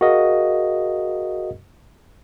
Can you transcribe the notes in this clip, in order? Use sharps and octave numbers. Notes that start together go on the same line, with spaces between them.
F#4 G#4 A#4 D#5 F5